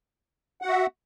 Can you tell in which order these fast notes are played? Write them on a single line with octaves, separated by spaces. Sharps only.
F#5 F#4 E5